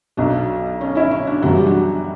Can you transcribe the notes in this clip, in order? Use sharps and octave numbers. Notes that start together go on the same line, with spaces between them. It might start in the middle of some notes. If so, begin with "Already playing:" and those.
B1 B2 F#3 D4
C#4
C#4 E4
C#4
D4
F#2 C#3 E3 G3 B3 F#4
G4
D4 F#4